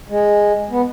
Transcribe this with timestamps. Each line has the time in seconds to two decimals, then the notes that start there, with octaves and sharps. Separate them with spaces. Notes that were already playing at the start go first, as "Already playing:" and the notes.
0.09 G#3
0.71 B3